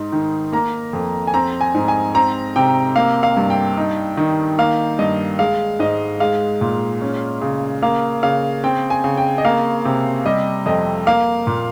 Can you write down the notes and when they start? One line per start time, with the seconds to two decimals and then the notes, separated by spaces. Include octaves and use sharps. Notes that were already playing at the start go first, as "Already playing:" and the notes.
Already playing: G#2 D#4 C6
0.12 D#3
0.52 A#3 A#5
0.93 F2
1.27 G#5
1.34 C4 A#5
1.61 G#5
1.75 G#2
1.88 G#5
2.15 C4 A#5
2.56 C3 G5
2.96 A#3 F5
3.23 F5
3.37 G2
3.50 G5
3.77 D#4
4.17 D#3
4.58 A#3 F5
4.99 G2 D#5
5.39 G#3 F5
5.79 G#2 D#5
6.20 G#3 F5
6.61 A#2
7.01 C#4
7.41 C#3
7.82 A#3 F5
8.23 C#3 F5
8.64 C4 G5
8.90 G#5
9.04 C#3
9.17 G5
9.38 D#5
9.45 A#3 F5
9.85 C3
10.26 G3 D#5
10.66 F2 D#5
11.07 A#3 F5
11.47 A#2